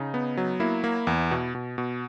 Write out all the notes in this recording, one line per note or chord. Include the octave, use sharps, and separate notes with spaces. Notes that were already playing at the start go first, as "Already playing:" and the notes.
Already playing: C#3 D#4
B3
F#3
A#3 E4
A#3
E2
B2
B2
B2